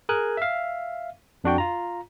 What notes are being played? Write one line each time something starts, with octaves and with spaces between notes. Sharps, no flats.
G#4 A#4 G#5 F#6
E5 F5
F2 D4 F#4 G5
F4 A#5